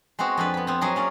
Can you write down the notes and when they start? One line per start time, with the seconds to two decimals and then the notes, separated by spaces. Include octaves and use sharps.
0.19 G#3 B3 C4 F#4
0.37 F2 C4 D4 B4
0.54 B3 B5
0.67 B3 C4
0.81 F#3 B3 G#4 D#5
0.96 A#3 C#4 D5